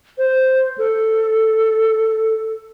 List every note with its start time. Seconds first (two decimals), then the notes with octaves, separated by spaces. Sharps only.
0.18 C5
0.78 A4